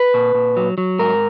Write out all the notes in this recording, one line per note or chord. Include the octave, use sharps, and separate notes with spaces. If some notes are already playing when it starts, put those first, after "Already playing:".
Already playing: B4
A#2
A#2
F#3
F#3
G#2 A#4